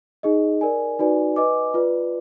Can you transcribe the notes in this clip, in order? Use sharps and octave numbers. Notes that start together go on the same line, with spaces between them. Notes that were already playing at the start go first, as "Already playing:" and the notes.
D#4 G#4 D#5
A#4 D5 G#5
D#4 F#4 B4 D5 G#5
B4 D#5 G#5 D6
F4 B4 D5